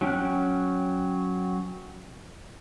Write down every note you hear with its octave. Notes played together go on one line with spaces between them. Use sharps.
F#3 C#4 G5 F6 F#6